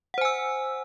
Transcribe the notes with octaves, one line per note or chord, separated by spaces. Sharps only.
C5 F#5 G#5 E6